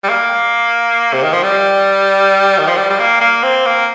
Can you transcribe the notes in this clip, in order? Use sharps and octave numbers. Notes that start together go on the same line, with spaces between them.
G3
A#3
C3
D#3
F3
G3
D#3
F3
G3
G3
A#3
A#3
C4
A#3